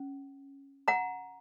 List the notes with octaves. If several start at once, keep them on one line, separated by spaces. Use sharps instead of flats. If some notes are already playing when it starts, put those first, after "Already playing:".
Already playing: C#4
F#5 A#5